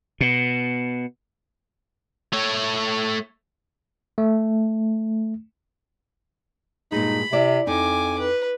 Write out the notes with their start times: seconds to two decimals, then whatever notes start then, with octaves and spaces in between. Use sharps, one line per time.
0.21 B2
2.33 A3 C#5
4.18 A3
6.92 G2 A#2 G#3 D#4 B5
7.32 C3 E4 D5
7.67 F2 D#4 G#5 D6
8.19 B4